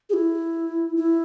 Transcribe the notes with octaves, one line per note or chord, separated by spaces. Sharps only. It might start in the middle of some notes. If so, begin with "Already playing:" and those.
G#4
E4
E4